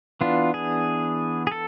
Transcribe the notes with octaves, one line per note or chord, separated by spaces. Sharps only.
E3 B3 D4 F4
G#4
G#4
A4